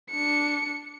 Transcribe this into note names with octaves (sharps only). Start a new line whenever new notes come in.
D4 C#7